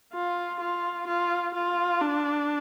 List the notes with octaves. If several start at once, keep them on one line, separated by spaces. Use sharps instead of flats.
F4
F4
F4
F4
D4